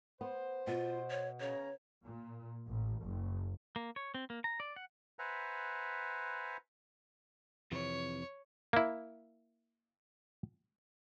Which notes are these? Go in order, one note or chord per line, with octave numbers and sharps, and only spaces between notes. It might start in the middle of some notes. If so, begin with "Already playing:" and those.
B3 C5
B2 F4
C#5
C#3 C#5 A#5
A#2
A1
F#1
A#3
C#5
C4
A#3
A#5
D5
F#5
B4 C5 E5 F#5 G#5 A#5
F2 C3 E3 C#5
A#3 E4